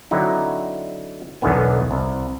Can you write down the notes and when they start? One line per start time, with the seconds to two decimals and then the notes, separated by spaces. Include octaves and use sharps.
0.11 D3 F#3 C4 D#4 E4
1.41 B1 E2 D3 D#3 B3 G#5
1.91 C2